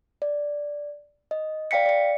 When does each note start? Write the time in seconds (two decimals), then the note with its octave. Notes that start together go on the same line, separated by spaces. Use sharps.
0.22 D5
1.31 D#5
1.71 D5 F5 G5 B6 C#7
1.86 D5 C#7